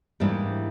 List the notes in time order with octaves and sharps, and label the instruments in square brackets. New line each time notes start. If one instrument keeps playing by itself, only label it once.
[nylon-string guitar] G#2 E3 G3 A#3 D4 E4